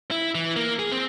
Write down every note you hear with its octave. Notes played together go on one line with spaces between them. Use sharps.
E4
E3
A#3
G#4
C4